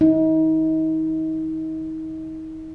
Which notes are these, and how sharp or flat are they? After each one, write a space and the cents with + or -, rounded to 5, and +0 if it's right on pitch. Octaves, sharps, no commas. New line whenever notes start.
D#4 +35